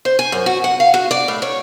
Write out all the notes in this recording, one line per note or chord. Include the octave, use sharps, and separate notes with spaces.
C5
G#5
F#2
F#4
F#5
F5
F#4
D5
A2
C#5